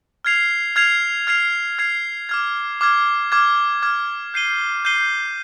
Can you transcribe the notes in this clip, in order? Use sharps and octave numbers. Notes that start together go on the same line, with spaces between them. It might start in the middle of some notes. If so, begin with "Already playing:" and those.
F6 G#6 C7 F7
F6 G#6 C7 F7
F6 G#6 C7 F7
F6 G#6 C7 F7
D6 F6 G#6
D6 F6 G#6
D6 F6 G#6
D6 F6 G#6
G6 C7 D#7 G7
G6 C7 D#7 G7